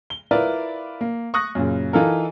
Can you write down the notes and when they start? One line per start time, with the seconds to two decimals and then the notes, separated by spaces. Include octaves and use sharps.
0.10 G7
0.31 E4 F4 A#4 B4 D5 E5
1.01 A#3
1.34 C#6 D#6 F#6 A#6
1.55 F#2 A#2 C#3
1.93 E3 D#4 F4 A4 A#4